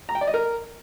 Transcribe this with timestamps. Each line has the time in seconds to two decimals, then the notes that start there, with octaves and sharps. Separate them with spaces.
0.09 A#5
0.15 G5
0.21 D5
0.27 D#5
0.34 A#4